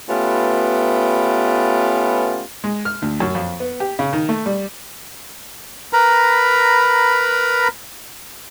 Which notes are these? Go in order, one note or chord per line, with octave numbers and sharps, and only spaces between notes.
A3 B3 C#4 F4 G4 B4
G#3
F6
D2
F#2
F2
B3
G4
C#3
D#3
A3
G3
A#4 B4 A#5 B5